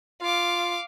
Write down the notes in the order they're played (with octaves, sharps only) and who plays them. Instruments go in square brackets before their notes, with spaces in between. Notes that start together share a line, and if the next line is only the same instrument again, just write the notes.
[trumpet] F4 [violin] F5 D6